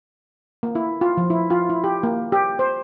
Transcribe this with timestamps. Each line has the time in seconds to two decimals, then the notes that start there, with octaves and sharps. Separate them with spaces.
0.63 A#3
0.75 E4
1.01 F4
1.17 F3
1.30 E4
1.50 F4
1.69 E4
1.84 G4
2.03 A#3
2.32 G4
2.59 C5